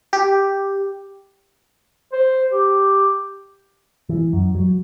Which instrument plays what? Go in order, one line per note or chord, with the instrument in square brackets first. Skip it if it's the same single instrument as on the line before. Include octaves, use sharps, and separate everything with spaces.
[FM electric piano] G4
[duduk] C5
G4
[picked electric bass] E3
F#2
F#3